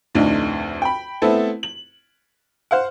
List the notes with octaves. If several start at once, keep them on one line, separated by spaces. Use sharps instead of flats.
F1 D2 A2 D4 D#4
G5 B5
A3 B3 C4 E4 A4
F#7
C5 F5 F#5